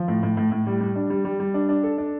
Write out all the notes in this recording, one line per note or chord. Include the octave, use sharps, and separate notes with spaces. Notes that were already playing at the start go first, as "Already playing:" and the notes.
Already playing: F3
A2
A2
A2
A2
G3
G3
D4
G3
G3
G3
D4
D4
A4
D4